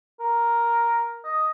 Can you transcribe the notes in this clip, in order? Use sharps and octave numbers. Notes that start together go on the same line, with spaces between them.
A#4
D#5